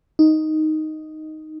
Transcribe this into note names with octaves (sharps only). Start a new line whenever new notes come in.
D#4